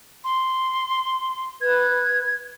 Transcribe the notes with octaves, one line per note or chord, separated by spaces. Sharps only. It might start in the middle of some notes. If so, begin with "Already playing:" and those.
C6
B4 G#6